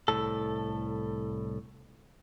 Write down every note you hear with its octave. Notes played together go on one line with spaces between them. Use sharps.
C2 A2 A4